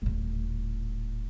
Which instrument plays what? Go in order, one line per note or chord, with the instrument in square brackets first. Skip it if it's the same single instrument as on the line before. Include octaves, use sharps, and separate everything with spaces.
[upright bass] D#1 A2